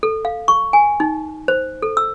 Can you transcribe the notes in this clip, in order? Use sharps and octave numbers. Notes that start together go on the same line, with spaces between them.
A4
F5
C#6
G#5
D#4
C5
A4
E6